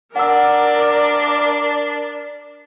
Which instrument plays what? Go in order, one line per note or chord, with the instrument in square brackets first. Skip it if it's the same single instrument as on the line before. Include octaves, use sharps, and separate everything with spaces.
[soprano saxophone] D4 [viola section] A#4 D5 [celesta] F#5 E6